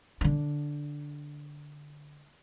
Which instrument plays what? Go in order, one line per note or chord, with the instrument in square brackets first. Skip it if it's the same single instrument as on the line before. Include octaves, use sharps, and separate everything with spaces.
[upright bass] D3 D4